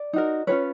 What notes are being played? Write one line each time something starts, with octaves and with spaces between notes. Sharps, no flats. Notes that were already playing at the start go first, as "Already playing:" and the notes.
Already playing: D5
D#4 F#4 A#4
C#4 F4 G#4 B4 C#5